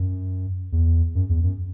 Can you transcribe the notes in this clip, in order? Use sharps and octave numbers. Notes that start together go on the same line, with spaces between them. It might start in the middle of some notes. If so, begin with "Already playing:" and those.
Already playing: F#2
E2
F#2
E2
F#2